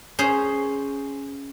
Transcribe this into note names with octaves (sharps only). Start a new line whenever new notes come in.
C#4 G#4 C5